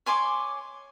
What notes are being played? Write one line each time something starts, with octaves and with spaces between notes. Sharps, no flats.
C#5 G#5 C6 D6